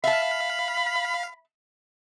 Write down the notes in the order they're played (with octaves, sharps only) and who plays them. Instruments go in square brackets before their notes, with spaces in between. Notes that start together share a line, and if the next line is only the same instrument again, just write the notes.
[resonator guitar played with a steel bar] E5 A5 [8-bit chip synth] F5 [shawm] B5